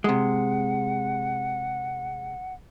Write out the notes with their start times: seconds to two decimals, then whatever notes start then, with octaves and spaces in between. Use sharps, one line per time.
0.04 C3 G#3 F#5